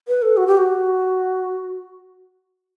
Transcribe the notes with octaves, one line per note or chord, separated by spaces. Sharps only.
B4
A4
F#4
G4
F#4